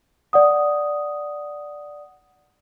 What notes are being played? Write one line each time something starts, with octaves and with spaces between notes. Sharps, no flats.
D5 F#5 D#6